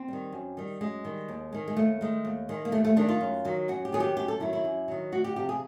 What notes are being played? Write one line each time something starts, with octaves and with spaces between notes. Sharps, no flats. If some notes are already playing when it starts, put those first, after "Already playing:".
Already playing: C4
D#3 G3
F#2
D#3 G3
F#2 G#3
D#3 G3
D#2
D#3 G#3
G#3
D#2 A3
D#3 G#3
D#2
D#3 G#3
A#3
D#2 A3
A3
D#3 G#3 D4
F4
F#2
D#3 F#3
F#2 F#4
G4
D#3 F#3 G#4
G4
F#2 G4
A4
D#3 F#3 E4
E4
F#2
D#3 F#3
D2 F#4
G4
C3 F3 G4
G#4